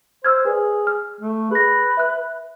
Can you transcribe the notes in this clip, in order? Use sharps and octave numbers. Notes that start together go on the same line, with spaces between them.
C5 E6 F6 G#6
G#4 B4 D5
F6
A3
G#4 B4 A#6
E5 F#6